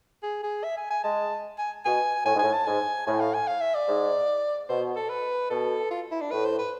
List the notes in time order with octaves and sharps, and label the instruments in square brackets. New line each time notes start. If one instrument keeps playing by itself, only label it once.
[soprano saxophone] G#4
G#4
E5
G#5
G#5
[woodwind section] G#3 [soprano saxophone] A5
[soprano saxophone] G#5
[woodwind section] B2 [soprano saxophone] G#5
[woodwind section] A2 [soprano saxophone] G#5
[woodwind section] G#2
[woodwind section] A2 [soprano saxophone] G#5
[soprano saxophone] A5
[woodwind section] G#2 [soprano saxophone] G#5
[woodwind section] A2 [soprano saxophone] G#5
[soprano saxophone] F5
G#5
F5
E5
D5
[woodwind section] G#2
[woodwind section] B2 [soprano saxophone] C5
[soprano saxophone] A4
B4
[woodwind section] B2 [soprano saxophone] A4
[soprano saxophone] F4
E4
D4
[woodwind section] A2 [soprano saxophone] B4
[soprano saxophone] C5
B4